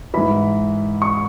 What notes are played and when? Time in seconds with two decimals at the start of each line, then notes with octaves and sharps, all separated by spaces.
0.14 G#2 E3 B5
1.02 C#6